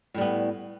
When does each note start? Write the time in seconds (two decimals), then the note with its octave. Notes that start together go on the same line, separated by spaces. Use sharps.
0.14 A2
0.18 G3
0.21 B3